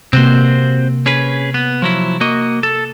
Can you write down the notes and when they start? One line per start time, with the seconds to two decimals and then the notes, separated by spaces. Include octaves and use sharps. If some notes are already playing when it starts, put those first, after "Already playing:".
0.13 C3 A#3 C4 F#4 C5
1.06 C#4 G#4 B4
1.54 B3
1.82 F3 F#3 E4
2.21 A#3 F#4 D#5
2.63 A4